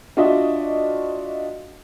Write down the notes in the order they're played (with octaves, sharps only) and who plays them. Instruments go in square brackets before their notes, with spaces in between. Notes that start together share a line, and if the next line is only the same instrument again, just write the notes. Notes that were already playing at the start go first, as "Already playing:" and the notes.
[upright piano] D4 F4 F#4 D#5 E5